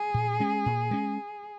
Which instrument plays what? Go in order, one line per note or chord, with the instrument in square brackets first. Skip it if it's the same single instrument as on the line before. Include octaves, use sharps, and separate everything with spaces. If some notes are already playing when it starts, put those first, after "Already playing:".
Already playing: [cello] G#4
[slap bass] A#2
G#3 C#4
A#2
G#3 C#4